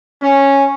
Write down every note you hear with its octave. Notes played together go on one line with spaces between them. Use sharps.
C#4